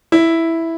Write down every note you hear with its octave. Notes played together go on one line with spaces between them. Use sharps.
E4